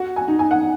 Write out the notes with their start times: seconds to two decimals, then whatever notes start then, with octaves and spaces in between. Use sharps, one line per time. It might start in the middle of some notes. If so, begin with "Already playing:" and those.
Already playing: F#4 F#5
0.16 G#5
0.28 D#4
0.39 G#5
0.51 F#5